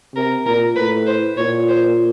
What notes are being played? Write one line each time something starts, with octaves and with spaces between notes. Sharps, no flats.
C3 A#4
A#2 A#4
A2 B4
C5
A#2 C#5
C5